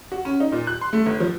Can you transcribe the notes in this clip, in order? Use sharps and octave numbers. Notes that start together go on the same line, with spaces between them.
F#4
C#4
D#4
A#2
F#6
C6
A3
G1
F3